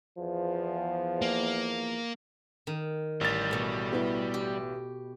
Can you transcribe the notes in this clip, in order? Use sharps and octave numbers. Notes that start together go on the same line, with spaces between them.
E2 F3
A#3
D#3
A1 G3 A6
B2 A3
B3 E4
G4